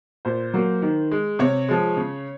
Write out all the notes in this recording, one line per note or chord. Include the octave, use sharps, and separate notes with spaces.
A#2 C5
F#3 A#3
D#3
G#3
C3 C#5
F3 G#3
C#3